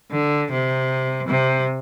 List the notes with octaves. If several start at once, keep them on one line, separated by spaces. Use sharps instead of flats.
D3
C3
C3